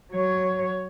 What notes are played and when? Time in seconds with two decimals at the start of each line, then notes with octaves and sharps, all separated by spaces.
0.12 F#3 C#5